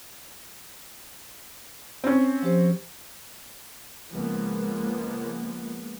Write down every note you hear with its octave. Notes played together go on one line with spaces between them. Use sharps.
C4 C#4
F3 G4 C5
C#2 F3 G#3 A#3 B3